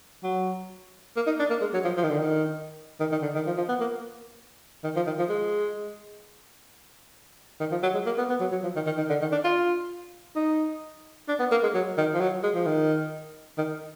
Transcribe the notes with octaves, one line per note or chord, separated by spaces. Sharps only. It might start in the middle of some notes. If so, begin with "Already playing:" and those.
F#3
A#3
D#4
D4
A#3
G#3
F#3
F3
F3
D#3
D3
D#3
D#3
D#3
D3
D#3
F3
F3
B3
A#3
D#3
F3
D#3
F3
G#3
D#3
F3
F#3
G#3
A#3
B3
B3
F#3
F#3
F3
D#3
D#3
D#3
D3
D#3
D4
F4
D#4
D4
B3
A#3
G#3
F#3
D#3
F3
F#3
G#3
F3
D#3
D#3